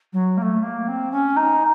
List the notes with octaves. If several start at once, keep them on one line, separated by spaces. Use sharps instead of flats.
F#3
A#3
A3
A#3
C4
C#4
D#4